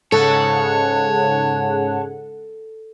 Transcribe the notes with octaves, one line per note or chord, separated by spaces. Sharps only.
G#2 C#3 A4 C#5 F#5 A5